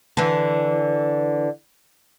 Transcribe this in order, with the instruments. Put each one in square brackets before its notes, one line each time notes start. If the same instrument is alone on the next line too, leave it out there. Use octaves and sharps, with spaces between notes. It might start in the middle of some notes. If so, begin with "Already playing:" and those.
[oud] D3 E3